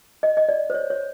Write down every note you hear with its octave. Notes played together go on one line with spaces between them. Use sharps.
D#5
D#5
D5
C5
C#5
C#5